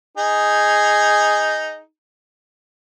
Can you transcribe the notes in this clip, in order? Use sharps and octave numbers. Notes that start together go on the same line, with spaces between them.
D#4 G#4